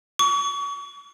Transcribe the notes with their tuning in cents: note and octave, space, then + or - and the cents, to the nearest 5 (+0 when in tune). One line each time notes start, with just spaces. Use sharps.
C#6 +35